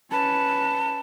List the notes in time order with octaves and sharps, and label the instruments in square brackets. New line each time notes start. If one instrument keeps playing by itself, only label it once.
[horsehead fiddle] C#4 B4 [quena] A5